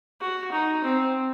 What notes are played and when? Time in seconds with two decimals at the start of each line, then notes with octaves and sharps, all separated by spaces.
0.21 F#4
0.52 D#4
0.84 C4